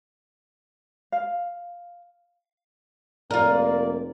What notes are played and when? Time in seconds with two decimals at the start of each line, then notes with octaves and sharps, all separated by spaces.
1.12 F5
3.31 F1 A#3 F4 A#4 D5